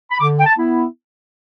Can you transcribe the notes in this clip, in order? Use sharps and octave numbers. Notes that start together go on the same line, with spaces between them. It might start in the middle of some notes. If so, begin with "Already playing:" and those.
B5
D3 D6
G5
A5
B3 E4